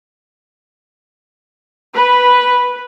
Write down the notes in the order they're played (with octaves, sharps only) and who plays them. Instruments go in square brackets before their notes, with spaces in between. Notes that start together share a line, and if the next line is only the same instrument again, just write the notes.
[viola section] B4